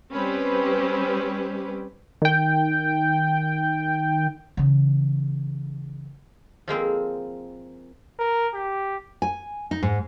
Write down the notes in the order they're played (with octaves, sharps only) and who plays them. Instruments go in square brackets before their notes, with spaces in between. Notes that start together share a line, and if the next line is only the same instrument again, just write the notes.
[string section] G3 C4 C#4 G4 B4 C5
[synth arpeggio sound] D#3 G5
[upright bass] C#3 E3
[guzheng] F3 G#3 A#3 C4
[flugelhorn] A#4
G4
[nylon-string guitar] G#5
D#4
G#2